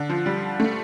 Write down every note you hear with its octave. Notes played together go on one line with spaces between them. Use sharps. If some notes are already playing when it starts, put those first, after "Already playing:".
Already playing: D3
F3
G3
A3